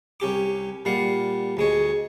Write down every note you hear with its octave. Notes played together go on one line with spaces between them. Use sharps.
C2 C#4 G4 D6
A#2 G3 F5 F#5
D2 G#3 C#5